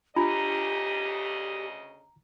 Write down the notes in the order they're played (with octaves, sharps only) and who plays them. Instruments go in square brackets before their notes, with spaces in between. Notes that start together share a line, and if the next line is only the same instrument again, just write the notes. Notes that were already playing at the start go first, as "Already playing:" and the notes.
[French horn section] D2 C#3 D#5 [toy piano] D4 F4 [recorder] G4 [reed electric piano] A#5